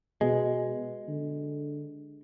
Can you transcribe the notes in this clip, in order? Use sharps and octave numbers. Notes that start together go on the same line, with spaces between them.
B2 G#3
D3